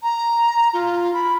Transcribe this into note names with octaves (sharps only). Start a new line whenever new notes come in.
A#5
F4
B5